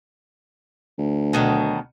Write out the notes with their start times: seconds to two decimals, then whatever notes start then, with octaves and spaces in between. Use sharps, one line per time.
0.98 D2
1.33 B2 D#3 F#3